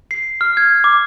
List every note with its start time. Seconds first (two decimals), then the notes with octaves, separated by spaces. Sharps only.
0.11 C7
0.41 F6
0.57 G#6
0.84 D6